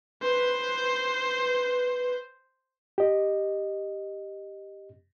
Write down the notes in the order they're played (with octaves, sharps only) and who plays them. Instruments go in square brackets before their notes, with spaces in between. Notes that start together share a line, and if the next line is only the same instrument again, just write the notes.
[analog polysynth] B4 [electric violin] C5
[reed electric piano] G4 D#5